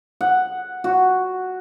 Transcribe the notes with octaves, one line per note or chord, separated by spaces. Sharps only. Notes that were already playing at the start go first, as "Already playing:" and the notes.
F#5
F#4